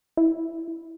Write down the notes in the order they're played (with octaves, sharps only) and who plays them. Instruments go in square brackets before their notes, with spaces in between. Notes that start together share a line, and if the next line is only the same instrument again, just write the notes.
[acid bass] E4